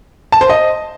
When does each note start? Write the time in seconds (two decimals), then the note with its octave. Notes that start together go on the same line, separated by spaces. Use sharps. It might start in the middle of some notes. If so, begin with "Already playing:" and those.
0.32 A5
0.41 C5
0.50 D#5